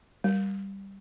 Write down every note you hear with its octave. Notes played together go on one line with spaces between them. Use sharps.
G3